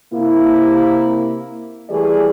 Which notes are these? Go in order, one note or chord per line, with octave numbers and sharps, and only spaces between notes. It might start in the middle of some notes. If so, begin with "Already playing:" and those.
C3 A#3 E4
E3 G3 A3 G4 G#4 D5